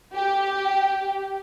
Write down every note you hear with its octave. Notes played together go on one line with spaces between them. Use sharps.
G4